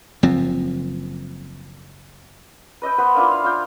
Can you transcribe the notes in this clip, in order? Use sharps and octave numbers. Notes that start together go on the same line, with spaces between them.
F#1 F3 C4
B4 D#5 E5 G5
B3 B4 C5 F#5
A#3 D4 E4 F4
F5
F4 E5 G5